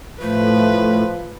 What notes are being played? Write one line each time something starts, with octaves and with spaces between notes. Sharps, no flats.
A2 F3 A3 B4